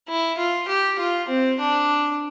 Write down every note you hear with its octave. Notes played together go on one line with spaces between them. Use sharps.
E4
F4
G4
F4
C4
D4